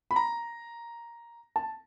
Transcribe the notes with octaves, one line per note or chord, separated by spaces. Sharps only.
B5
A#5
A5